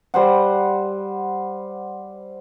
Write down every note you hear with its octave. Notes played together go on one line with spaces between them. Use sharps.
G3 C5 F#5